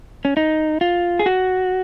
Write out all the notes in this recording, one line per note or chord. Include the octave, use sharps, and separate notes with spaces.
C#4
D#4
F4
G#4
F#4